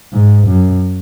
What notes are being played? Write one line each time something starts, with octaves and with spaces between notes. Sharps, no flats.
G#2
F#2